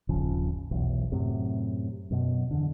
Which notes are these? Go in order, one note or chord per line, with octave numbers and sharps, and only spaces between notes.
D#1 G#1 C#3 F3
F1 B1 E2
F#2 A2 C3
F#2 B2
E2 D3